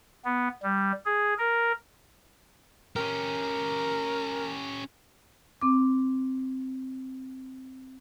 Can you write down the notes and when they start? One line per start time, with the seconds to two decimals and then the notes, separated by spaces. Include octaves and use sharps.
0.25 B3
0.63 G3
1.05 G#4
1.38 A#4
2.96 C#4 G4 A#4
5.61 C4 D6